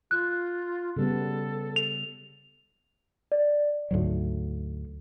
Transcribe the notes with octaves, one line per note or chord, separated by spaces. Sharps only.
F4 F#6
C#3 G3 B3 A4
F7
D5
D2 G#2 F#3